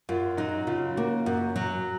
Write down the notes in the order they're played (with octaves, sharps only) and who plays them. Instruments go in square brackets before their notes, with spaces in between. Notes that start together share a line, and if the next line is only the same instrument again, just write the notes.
[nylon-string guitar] F#2 [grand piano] F4
[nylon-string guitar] F#3 [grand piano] D#4
[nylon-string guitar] C#3 [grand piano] F4
[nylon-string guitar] A#3 [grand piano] F#4
[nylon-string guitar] F#2 [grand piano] F#4
[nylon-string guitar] F#3